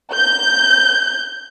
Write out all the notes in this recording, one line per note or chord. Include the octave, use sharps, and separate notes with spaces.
G6